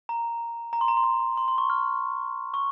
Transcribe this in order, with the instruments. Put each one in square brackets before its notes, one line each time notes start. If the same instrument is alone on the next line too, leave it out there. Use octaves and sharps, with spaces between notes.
[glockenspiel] A#5
A#5
C6
A#5
C6
A#5
C6
C6
C#6
F6
C#6